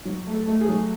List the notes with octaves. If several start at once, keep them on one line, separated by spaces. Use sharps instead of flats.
F#3
A3
A4
A3
G#4
F#3